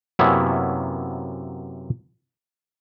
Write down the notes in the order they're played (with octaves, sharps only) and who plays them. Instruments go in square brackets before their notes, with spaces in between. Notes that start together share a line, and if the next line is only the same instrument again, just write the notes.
[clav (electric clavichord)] F#2 C3 A#3 B3 C#4 E4